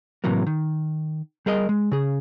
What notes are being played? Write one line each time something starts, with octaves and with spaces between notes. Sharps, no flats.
A2 C3 E3 F#3 A#3
D#3
G3 G#4 A#4 D#5
G#3
C#3 G#4